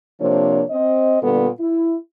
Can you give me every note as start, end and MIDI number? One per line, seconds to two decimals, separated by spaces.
0.20 0.63 48
0.20 0.63 53
0.20 0.63 58
0.20 0.63 62
0.20 0.63 73
0.70 1.19 60
0.70 1.19 75
1.22 1.48 46
1.22 1.48 50
1.22 1.48 55
1.22 1.48 59
1.22 1.48 69
1.60 1.96 64